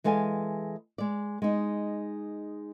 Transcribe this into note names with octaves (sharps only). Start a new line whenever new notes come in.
E3 G#3 A4 F5 G#5
G#3 D5
G#3 D#4